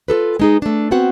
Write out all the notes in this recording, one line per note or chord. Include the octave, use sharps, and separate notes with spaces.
F4 G#4 A4 B4
G#3 D#4 G#4
A3 D4
B3 C4 F#4 F#5